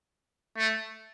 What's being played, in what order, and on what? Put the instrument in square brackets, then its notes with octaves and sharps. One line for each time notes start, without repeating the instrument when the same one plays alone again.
[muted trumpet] A3